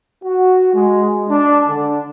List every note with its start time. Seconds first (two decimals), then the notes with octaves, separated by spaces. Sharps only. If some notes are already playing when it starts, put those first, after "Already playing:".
0.23 F#4
0.74 G#3
1.29 D4
1.68 D3